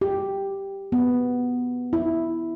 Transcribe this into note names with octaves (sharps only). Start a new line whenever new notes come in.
G4
B3
E4